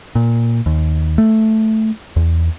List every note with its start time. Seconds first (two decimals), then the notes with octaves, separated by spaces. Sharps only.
0.15 A#2
0.66 D#2
1.18 A3
2.16 E2